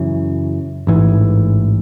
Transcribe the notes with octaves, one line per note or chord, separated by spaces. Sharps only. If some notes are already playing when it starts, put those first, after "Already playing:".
Already playing: F#2 C#3 E3
A1 G#2 E3